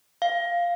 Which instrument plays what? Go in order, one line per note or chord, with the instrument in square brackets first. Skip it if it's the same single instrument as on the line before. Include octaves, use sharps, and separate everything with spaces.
[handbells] F5